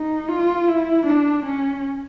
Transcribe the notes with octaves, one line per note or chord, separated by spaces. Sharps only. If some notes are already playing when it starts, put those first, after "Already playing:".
Already playing: D#4
F4
E4
D4
C#4